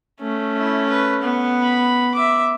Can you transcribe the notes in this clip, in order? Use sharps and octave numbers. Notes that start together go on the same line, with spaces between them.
A3 C#4
E4
B4
B3
B5
E5 D6